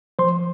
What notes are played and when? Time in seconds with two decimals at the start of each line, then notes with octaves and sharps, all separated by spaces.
0.19 F3 C5 C6